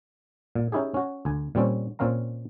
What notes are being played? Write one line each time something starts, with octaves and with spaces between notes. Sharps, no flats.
A#2
C#4 D#4 E4 G4 G#4
C#4 F#4
D2 G#5
A#2 G3 C4 C#4
A#2 C4 C#4 F5 A#5